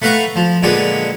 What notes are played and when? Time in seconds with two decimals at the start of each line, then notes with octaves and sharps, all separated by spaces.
0.02 A3 B4 F5 F#5 A#5 C#6
0.36 F3
0.63 A#2 D3 G#3 A#3 B3 G#4